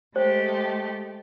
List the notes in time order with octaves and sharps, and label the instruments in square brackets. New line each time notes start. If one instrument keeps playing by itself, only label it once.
[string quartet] G#3 A3 G4 [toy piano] C5